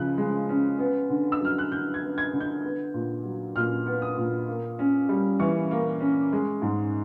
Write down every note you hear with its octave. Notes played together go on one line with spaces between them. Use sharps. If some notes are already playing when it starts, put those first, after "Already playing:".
Already playing: C#3 F3 C#4 F#6
G#3
C#4
B3
D3
E6
F#3 F6
F#6
D3 G6
G#6
B3
G#6
D3
G6
B3
A#2
F#3
A#2 F6
B3
D#6
A#2
A#3
C#4
G3
E3 C#6
A#3
C#4
G#3
G#2